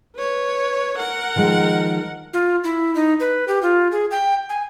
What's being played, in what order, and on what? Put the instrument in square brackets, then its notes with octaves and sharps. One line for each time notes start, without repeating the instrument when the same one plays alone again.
[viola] B4 C#5
A#4 F#5
[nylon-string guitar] D#3 F3 G#3
[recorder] F4
E4
D#4
B4
G4
F4
G#4
G5
G#5